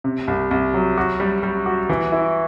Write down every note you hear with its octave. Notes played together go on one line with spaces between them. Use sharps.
C3
C2
C2
F#3
F#4
G3
G3
F#4
E3
E4